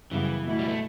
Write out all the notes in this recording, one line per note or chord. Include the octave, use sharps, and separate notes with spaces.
F#2 C#3 E3 G3 B3
B2 A3 E4
G3
A3